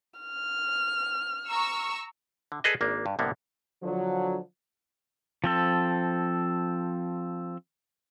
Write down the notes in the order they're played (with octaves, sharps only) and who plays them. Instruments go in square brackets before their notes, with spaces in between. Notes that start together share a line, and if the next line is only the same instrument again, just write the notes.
[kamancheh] F6
[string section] A#5 C#6 E6
[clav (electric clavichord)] D3
G#4 A4 B4 D5 D#5
G#1 A#3 D4
G2
C2 A2 D3 A#3 B3
[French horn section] D3 F3 F#3
[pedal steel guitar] F3 C4 A4